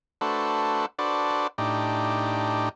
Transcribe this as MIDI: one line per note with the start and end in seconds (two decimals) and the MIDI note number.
0.21 0.86 57
0.21 0.86 62
0.21 0.86 66
0.21 0.86 69
0.21 0.86 71
0.21 0.86 72
0.99 1.47 62
0.99 1.47 66
0.99 1.47 69
0.99 1.47 71
0.99 1.47 72
0.99 1.47 74
1.58 2.69 45
1.58 2.69 62
1.58 2.69 63
1.58 2.69 67